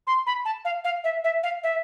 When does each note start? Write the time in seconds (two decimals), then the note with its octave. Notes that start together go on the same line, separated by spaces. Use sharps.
0.07 C6
0.27 B5
0.45 A5
0.65 F5
0.84 F5
1.04 E5
1.24 E5
1.43 F5
1.63 E5